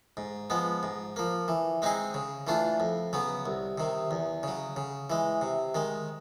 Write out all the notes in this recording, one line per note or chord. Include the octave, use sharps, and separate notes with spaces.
G#2
F3 G#3 B3
G#2
F3 A#3
E3
G#3 C4 D#4 G#4
C#3
E3 A3 D4 F4
F2
C#3 F#3 B3
C2
C3 D#3
E2
C#3 F#3
C#3
E3 G#3
C3
D#3 G#3